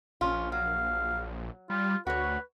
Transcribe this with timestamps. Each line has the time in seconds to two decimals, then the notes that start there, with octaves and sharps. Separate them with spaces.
0.21 A#1 C#4 F4
0.52 F#3 F5
1.70 G3 F4
2.07 D2 F#4 B4 C#5